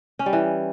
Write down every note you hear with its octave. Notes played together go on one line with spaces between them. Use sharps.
C#4
G3
E3